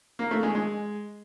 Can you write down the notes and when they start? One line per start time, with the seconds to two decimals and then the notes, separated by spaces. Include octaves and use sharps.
0.19 A#3
0.31 A3
0.43 G#3
0.55 G#3